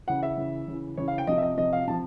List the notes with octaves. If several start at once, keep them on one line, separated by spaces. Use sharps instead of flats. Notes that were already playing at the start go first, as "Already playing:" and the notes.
C#3 E3 F#5
E5
C#3 E3
C#3 E3
C#3 E3 C#5
F5
G5
C3 F3 D#5
E5
D#5
C3 F3 D#5
F5
C3 F3 A5